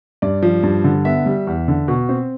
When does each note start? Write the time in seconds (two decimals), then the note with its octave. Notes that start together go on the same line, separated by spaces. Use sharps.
0.22 G2 D5
0.42 F3
0.63 G2
0.84 D3
1.05 B3 E5
1.26 G3
1.47 E2
1.68 D3
1.88 B2
2.09 C4